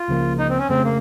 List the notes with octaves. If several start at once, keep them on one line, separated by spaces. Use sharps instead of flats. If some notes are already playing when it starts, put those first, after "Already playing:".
Already playing: F4
C#2 C#3 F3 A#3
D#4
C4
C#4
F2 C#3 A3 C4
A#3